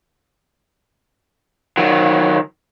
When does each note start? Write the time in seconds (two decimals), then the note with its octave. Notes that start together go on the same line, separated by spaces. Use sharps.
1.77 D#3 F#3